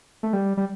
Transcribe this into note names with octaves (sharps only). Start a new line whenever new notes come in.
A3
G3
G3